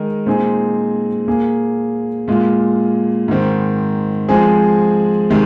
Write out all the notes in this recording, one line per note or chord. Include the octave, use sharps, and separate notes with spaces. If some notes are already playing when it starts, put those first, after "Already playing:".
Already playing: D#3 G#3 D#4 A#4
A#2 G#3 C4 D#4 G#4
A#2 A#3 G#4
A#2 G#3 F4
G#2 D#3 C4
F3 G#3 C4 G#4
C3 D#3 G#3